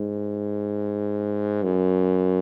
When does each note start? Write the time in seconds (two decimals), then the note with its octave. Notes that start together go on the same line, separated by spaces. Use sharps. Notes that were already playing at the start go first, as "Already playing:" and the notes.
Already playing: G#2
1.63 F#2